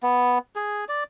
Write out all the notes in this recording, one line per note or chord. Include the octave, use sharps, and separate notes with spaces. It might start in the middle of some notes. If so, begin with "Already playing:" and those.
B3
G#4
D5